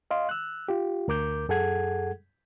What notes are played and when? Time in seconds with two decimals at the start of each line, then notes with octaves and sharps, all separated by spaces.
0.11 D#5 F5 C6
0.29 E6 F#6
0.68 F4 G4
1.08 D2 A#4 D6 G6
1.49 F#2 G#4 A4 F#5 G#6